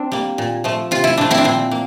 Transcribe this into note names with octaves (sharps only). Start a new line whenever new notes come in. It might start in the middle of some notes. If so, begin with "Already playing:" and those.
Already playing: C4 D4
G3 A#3
A#2
F3 A3
C3 F4
E4
F3 A3 D4
C4 E4
D4
A#2 C4
A#3